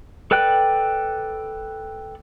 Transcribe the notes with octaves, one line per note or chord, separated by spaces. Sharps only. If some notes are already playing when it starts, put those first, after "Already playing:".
A4 B4 D5 G5 F#6